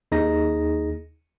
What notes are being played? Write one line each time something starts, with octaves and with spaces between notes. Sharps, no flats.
D#2 D#4 G#4 A#6